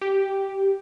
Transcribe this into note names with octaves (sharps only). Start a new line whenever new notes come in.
G4